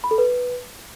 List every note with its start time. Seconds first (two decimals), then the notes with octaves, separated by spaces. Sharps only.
0.04 B5
0.11 A4
0.18 B4